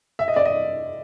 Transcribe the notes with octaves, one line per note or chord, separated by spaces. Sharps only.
E5
D#5
D5
D#5